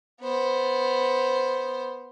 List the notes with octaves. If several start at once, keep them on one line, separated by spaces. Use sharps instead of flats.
B3 C5